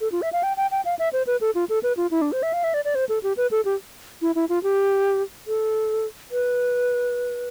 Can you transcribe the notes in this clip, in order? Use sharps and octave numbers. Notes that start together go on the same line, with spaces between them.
A4
F4
E5
F5
G5
G5
G5
F5
E5
C5
B4
A4
F4
A4
B4
F4
E4
D4
C5
E5
F5
E5
D5
D5
C5
A4
G4
B4
A4
G4
E4
E4
F4
G4
A4
B4